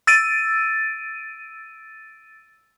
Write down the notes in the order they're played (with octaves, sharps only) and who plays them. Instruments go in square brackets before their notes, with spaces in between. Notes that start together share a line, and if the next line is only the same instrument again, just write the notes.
[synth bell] E6 A6 D7 D#7